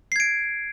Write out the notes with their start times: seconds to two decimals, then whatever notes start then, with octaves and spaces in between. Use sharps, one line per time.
0.12 C7
0.16 G#6
0.20 D7